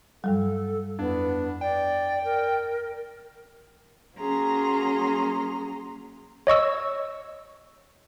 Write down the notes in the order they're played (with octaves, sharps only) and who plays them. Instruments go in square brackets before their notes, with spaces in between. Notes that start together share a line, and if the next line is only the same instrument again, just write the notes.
[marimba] G2 F#3 G3 [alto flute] A4
[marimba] F2 [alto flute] B3 [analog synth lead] D4
[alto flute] D5 [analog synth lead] G5
[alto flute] A#4
[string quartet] F#3 A#3 C#4 G#4 A#5 C6
[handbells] C#5 D#5 C#6 E6